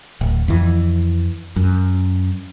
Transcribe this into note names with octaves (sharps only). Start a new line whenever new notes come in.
D1
F2 E3
F#2